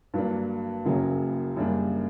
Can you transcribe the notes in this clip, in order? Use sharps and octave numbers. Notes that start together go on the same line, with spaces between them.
G2 F#3 A#3 D4
F#1 F#2 C#3 F#3 A#3
F#2 C#3 G3 A#3 D4